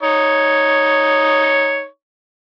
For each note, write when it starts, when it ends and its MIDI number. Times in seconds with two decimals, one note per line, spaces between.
0.03 1.86 63
0.03 1.86 73